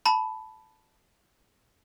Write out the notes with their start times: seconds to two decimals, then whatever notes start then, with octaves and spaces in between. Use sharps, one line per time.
0.06 A5 B5